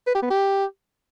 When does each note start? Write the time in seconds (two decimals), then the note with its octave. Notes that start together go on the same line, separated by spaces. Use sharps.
0.07 B4
0.15 G4
0.23 B3
0.30 G4